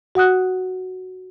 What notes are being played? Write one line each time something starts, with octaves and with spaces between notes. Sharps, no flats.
F#4 F#5 D#6 F#6